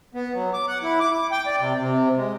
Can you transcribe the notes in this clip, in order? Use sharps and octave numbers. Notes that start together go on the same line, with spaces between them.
B3
F#3
D6
F#5
E4
D6
D6
G5
D5
C3
C3
G#3